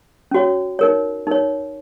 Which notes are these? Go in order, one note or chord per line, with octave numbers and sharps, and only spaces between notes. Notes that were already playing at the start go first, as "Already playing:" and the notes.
C#4 F#4 C#5
D#4 A#4 C#5
D#4 A#4 C#5